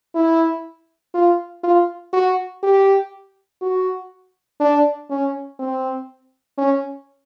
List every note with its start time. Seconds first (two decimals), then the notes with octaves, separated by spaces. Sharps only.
0.15 E4
1.14 F4
1.64 F4
2.13 F#4
2.63 G4
3.62 F#4
4.60 D4
5.10 C#4
5.59 C4
6.58 C#4